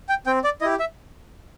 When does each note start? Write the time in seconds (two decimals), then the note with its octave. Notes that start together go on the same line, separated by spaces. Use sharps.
0.09 G5
0.26 C4 G5
0.44 D5
0.61 E4 G4 D#5
0.79 E5